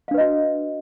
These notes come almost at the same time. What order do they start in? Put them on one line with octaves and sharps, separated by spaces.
F5 D4 B4 D#5 F#4